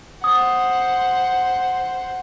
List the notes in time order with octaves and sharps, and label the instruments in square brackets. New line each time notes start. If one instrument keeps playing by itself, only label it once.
[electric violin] C5 F#5 [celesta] D#6